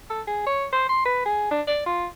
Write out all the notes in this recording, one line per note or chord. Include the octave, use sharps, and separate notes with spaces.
A4
G#4
C#5
C5
C6
B4
G#4
D4
D5
F4